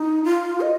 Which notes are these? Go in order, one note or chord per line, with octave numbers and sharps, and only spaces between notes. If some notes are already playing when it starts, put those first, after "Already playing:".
Already playing: D#4
F4
D#5